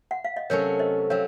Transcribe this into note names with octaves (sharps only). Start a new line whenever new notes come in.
F#5
F5
D#5
C3 F#3 A3 C#4 A#4 C#5
C5 D#5
F#3 C4 C#5 F5